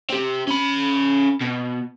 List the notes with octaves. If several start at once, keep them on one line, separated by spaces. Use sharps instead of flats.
C4 G4
C#4 B5
B2